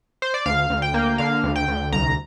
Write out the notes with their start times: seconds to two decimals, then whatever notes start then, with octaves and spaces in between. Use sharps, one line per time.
0.22 C5
0.34 D5
0.46 D2 F5
0.70 D2
0.82 G5
0.94 A#3
1.18 D3 F5
1.43 D2
1.56 G5
1.68 D2
1.92 C2 A#5